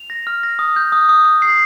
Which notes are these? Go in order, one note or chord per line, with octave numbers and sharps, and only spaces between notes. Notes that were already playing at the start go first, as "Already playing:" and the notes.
Already playing: F7
A#6
F6
A#6
D#6
G6
D#6
D#6
D#6
C7